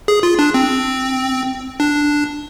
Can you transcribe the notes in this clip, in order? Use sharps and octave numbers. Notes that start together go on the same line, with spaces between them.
G#4
F4
D4
C4
D4